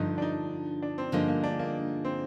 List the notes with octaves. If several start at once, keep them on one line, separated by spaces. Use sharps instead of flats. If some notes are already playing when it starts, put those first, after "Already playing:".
Already playing: G2 D3 F3 D#4
D4
D#4
D4
C4
G2 D3 F3 G#3 A#3 D#4
A#3
D4
A#3
C4